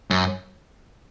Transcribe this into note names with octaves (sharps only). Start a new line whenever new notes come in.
F#2